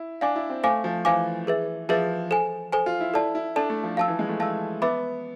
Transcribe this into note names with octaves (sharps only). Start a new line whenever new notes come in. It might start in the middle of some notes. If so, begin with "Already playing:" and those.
Already playing: E4
D4 D5 F5 G#5 D6
E4
C4
A3 C5 F5 G#5 D6
F3
E3 C5 F5 G#5 D6
G#4 B4 E5
F3 G#4 B4 E5
A4 C5 G#5
A4 C5 G#5
F4
E4
E4 A4 D5 A5
E4
D4 A4 D5 A5
A3
F3
F3 F5 A5 E6
E3
G#3
A3
A3 F5 A5 E6
B3 B4 E5 B5 D6